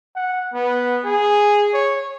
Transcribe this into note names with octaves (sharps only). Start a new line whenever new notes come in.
F#5
B3
G#4
C#5